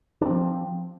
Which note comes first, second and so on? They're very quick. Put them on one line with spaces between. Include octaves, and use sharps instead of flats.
D4 C4 F3